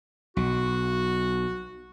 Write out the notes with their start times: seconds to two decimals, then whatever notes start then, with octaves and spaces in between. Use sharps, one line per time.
0.37 B1 F#4